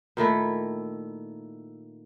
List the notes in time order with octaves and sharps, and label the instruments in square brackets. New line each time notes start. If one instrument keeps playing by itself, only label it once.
[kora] A#2 D#3 A3 E4